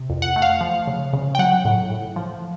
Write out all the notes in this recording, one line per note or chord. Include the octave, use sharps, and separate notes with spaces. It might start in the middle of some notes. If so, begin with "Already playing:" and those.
Already playing: C3
F2
F#5
A3
F5
F3
C#3
C#3
G5
F#3 F#5
A2
A2
F3